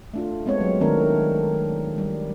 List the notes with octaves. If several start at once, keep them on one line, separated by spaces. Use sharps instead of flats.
A3 D4 F4
G#3 B3 C4 C#5
F#3
D#3 A3 C4 D4 A#4
G3